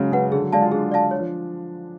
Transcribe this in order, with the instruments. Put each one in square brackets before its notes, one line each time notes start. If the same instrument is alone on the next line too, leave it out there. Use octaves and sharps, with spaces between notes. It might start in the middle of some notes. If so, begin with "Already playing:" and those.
Already playing: [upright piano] C#3 F#3 G#3
[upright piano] C#3 [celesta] B4 F#5
[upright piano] D3 [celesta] G#4
[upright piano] F#3
[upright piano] G#3 [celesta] D5 F5 A5
[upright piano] F4
[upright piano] D4 [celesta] G#4
[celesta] D5 F5 A5
C#5
[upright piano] F3